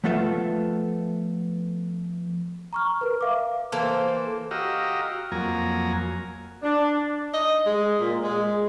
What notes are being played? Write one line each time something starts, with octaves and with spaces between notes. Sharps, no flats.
F3 A3 B3 F4 A4 E5
A#5 C#6 F6
A#4 B4
E5 F5 D6
E3 A#3 A4 C5
F#4 G4 D#5 F5 A#5 E6
F2 F#3 A#3 G#5 A#5
D4
D#5
G#3
A#2
G#3